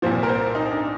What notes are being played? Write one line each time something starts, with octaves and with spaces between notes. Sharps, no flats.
C2 A#2 F3 C5
A#4
C5
D#4
D4